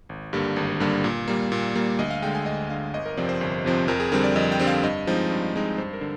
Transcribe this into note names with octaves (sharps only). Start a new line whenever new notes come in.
G#1
G2 D3 G3 A#3
G#1
G2 D3 G3 A#3
A#2
G3 A#3
A#2
G3 A#3
D2 D#5
F5
D3 G#3 G5
G#5
D2 D#5
D3 G#3 F5
G1 D#5
A#4
F2 C3 F3 C4 D5
C5
G1
F2 C3 F3 C4
F2 A#4
G#4
D3 G3 C4 A#4
D5
F2 D#5
G5
D3 G3 C4
F5
G2 D#5
F3 G#3 C4 D#4
G2
F3 G#3 C4 D#4
G2 C5
A#4
D3